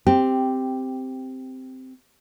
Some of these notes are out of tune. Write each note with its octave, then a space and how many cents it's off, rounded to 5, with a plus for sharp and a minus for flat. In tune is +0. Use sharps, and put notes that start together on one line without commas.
C4 -10 G4 +0